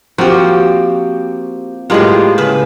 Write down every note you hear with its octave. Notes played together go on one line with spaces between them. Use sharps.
F3 A#3 C4 F#4 G4
A2 G#3 A#3 B3 F4 G4
C#3 B4